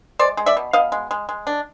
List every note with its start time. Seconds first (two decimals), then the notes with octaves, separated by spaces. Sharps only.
0.19 G#3 C5 D5
0.37 G#3
0.46 D5 E5
0.57 B2
0.73 B2 D#5 F5
0.92 G#3
1.11 G#3
1.29 G#3
1.47 D4